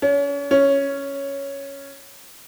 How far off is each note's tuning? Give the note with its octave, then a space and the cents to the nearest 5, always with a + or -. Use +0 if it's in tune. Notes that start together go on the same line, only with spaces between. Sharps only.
C#4 +35
C#4 +0